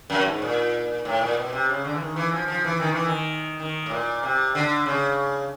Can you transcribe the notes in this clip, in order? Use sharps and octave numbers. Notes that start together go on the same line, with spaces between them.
F#2
G#2
A#2
A2
A#2
B2
C3
C#3
D3
E3
D#3
E3
F3
F3
E3
D#3
E3
D#3
D#3
A2
A#2
C3
D3
C#3